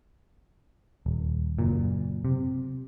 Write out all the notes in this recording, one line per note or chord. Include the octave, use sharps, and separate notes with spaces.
D#1
F#1 A#2
C3